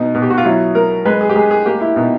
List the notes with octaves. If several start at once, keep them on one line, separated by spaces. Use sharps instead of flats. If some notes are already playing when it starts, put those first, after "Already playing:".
Already playing: B2 D#4
B2
G4
F#4
F4
F#3 E4
F#3 A#4
G#3 B4
G#4
G4
G#3 G#4
G#4
A#3 G4
E4
B2 D#4